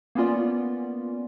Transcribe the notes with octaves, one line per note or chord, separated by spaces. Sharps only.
A#3 B3 C#4 F4 D5